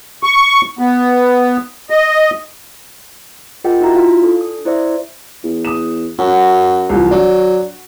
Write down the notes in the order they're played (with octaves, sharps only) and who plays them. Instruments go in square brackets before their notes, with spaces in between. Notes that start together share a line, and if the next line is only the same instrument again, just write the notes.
[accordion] C#6
B3
D#5
[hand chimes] F4 G#4 A#4 D#5 F#5 G5
D#4 E4 F#4 E5 A#5
E4 F4 F5
D4 A4
D#6
E4 C5 D5 E5
[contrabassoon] E2
[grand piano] D#6 E7
[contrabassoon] F#2 [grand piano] C#4 [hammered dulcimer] F#4
[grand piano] C2 E3 F3
[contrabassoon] F#3 [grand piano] D4